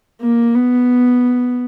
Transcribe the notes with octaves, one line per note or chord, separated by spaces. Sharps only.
A#3
B3